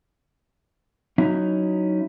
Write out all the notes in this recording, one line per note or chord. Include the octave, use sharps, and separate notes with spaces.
F#3 C#4 D#4 E4